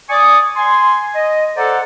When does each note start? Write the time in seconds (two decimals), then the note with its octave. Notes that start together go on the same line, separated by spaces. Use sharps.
0.10 D5 G#5 C#6 D#6
0.56 G#5 C6
1.15 D#5
1.56 A4 C5 D5 F#5 A#5